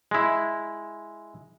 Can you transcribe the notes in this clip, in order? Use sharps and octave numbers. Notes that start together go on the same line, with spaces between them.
G#3 E4